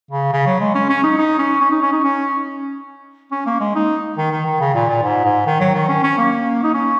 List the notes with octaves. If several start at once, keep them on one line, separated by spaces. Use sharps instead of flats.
C#3
C#3
F#3
G#3
C#4
C#4
D#4
D#4
C#4
C#4
D#4
C#4
D#4
C#4
C#4
A#3
G#3
D#4
D#3
D#3
D#3
C#3
A#2
A#2
G#2
G#2
D#3
F#3
D#3
C#4
C#4
A#3
D#4
C#4